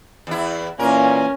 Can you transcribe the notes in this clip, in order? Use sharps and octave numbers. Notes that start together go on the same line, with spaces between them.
E2 E4
A#2 E3 A#3 C#4 A#4 G#5